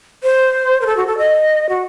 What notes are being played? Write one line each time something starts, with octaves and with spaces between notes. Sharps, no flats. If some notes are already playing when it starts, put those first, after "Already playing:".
C5
A#4
A4
F#4
A4
D#5
F#4